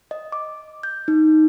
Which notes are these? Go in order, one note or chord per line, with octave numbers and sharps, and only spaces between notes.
D#5
D6
G6
D#4